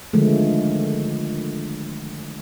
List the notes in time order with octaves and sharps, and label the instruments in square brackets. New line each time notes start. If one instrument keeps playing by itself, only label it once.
[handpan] D3 D#3 F3 G#3 A3